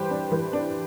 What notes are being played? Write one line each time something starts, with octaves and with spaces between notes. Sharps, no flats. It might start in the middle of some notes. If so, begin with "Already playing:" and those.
Already playing: E3 G3 G4 B4 C5
D4
E3
D4